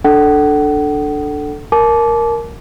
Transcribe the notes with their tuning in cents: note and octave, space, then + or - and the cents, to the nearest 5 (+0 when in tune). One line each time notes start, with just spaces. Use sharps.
D4 +0 A4 +0 F#5 +40
A#4 +0 A5 -35 D6 -10